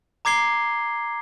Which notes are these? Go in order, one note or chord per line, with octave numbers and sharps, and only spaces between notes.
A#5 D6 G#6 C7 G7